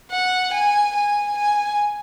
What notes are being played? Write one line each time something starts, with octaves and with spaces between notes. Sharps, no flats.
F#5
G#5
G#5
G#5